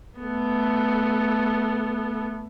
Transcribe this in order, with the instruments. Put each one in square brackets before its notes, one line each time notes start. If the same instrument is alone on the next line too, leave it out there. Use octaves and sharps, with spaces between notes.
[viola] A3 B3